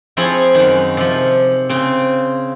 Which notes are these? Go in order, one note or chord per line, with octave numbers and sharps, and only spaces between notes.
F3 C4 E4 G#4 C#5
F#2 D#3
C3 F3
C#3 C4